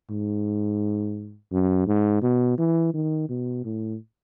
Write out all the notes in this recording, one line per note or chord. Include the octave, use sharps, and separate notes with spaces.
G#2
F#2
G#2
B2
E3
D#3
B2
A2